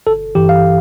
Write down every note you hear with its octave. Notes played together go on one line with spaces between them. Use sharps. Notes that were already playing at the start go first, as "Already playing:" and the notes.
G1 A4
G2 E3 G4
F5